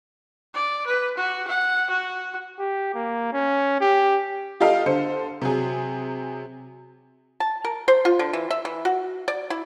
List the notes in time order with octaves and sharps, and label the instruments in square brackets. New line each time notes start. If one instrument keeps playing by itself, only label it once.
[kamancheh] D5
B4
F#4
F#5
F#4
[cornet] G4
A#3
C#4
G4
[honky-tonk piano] F4 G4 A4 D#5 F5
D3 A4 C5 C#7
C3 F#3 G#4
[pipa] A5
A#4
C5
F4
D3
E3
E5
E3
F#4
D5
E4